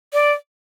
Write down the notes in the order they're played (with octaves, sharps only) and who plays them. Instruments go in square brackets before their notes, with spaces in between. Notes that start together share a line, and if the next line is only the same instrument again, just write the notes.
[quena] D5